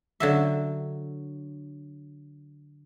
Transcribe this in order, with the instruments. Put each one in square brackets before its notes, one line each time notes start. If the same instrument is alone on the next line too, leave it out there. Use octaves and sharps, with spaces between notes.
[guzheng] D3 F#3 E5